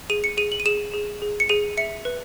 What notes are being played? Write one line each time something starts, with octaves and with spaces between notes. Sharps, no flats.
G#4 D#7
C#7
G#4 D#7
F#7
D#7
G#4 E7
G#4
G#4
C#7
G#4 D#7
E5 C#7
B4